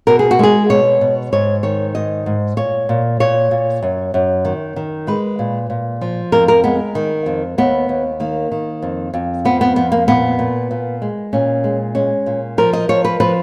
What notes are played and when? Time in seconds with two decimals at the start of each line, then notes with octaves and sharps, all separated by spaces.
0.07 B2 A#4
0.19 G#4
0.31 F#4
0.39 G#3 G#4
0.70 B2 C#5
1.01 B2
1.33 G#2 C#5
1.63 D#3 C#5
1.95 G#2 D#5
2.26 G#2
2.57 A#2 C#5
2.89 A#2
3.20 A#2 C#5
3.51 A#2
3.83 F#2
4.14 F#2
4.45 D#3
4.76 D#3
5.07 G#3 B4
5.39 A#2
5.70 A#2
6.01 F3
6.32 F2 A#4
6.48 A#4
6.64 G#3 B3
6.95 D#3
7.26 F2
7.58 D#2 B3
7.89 D#2
8.20 D#3 A#3
8.52 D#3
8.82 F2
9.14 F2
9.45 F3 B3
9.61 B3
9.76 F2 B3
9.92 A#3
10.08 A#2 B3
10.39 A#2
10.71 A#2
11.02 G#3
11.33 A#2 C#4
11.64 G#3
11.95 G#3 C#4
12.26 A#2
12.58 F3 A#4
12.73 D#5
12.89 F3 C#5
13.05 B4
13.20 F3 B4